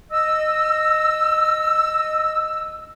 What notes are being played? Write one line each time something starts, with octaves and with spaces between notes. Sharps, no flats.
D#5 E6